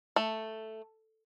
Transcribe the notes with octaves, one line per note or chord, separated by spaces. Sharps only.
A3